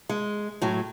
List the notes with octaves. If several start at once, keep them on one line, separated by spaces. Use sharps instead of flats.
G#3
A2 F#3